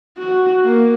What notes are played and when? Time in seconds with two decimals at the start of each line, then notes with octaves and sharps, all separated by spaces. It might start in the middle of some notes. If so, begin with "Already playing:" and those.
0.18 F#4
0.64 A#3